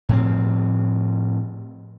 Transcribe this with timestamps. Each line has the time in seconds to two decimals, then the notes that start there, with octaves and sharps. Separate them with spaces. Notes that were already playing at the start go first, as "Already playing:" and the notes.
0.09 A2 F3 C4